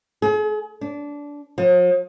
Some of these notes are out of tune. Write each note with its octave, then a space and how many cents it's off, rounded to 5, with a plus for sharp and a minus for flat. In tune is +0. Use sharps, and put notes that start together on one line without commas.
G#4 +40
D4 -20
F3 +45